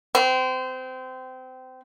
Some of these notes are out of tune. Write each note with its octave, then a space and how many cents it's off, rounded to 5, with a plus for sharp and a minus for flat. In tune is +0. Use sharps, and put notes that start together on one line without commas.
C4 -25